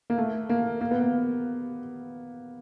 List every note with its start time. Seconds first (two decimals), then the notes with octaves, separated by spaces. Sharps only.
0.10 A#3
0.18 A3
0.49 A#3
0.81 A#3
0.91 B3
1.01 A#3